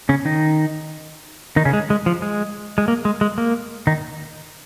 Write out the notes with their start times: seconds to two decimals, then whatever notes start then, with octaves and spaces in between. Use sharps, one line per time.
0.09 C#3 C#4
0.25 D#3 D#4
1.56 D#3 D#4
1.65 C#3 C#4
1.73 G#3
1.90 G#3
2.06 F3
2.22 G#3
2.78 G#3
2.88 A#3
3.05 G#3
3.21 G#3
3.38 A#3
3.87 D#3 D#4